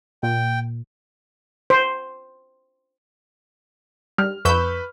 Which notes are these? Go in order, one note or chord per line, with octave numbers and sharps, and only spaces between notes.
A#2 G5
C5
G3 F6
F2 B4 B5 C#6 E6 G6